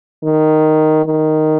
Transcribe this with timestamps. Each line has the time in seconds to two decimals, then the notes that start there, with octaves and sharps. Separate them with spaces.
0.23 D#3
1.06 D#3